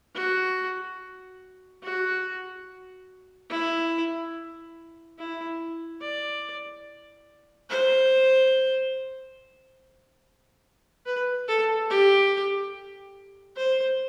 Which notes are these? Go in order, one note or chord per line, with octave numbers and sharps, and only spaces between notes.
F#4
F#4
E4
E4
D5
C5
B4
A4
G4
C5